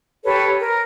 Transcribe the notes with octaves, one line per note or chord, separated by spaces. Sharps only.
G4 A4 B4 C#5
A#4